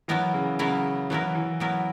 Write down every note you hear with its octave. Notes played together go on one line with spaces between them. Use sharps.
E3 F#3 B3 E4 A#4
C#3
C#3 F#3 B3 E4 A#4
E3 F#3 B3 E4 A#4
E3
F#3 B3 E4 A#4